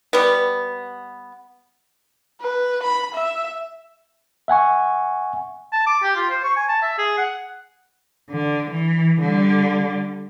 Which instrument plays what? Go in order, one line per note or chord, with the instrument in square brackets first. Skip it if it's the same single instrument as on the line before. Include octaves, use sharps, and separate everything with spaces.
[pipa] G3 B3
[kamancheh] B4
B5
E5
[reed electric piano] E5 F#5 G#5 C#6
[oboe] A5
D6
G4
F4
C5
C#6
G#5
A5
E5
G#4
F#5
[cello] D3
E3
D3 G3